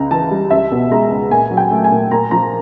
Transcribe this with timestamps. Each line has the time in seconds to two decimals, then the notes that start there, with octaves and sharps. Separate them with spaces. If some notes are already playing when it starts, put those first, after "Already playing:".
Already playing: C#2 C#3 A#5
0.11 E3 A5
0.31 G3
0.51 C#2 E5
0.72 B2
0.91 G#3 A#5
1.11 C#2
1.31 A#2 G#5
1.51 F#3
1.57 G5
1.71 A3
1.84 G#5
1.91 A#2
2.11 A#2 A#5
2.31 F3 A#5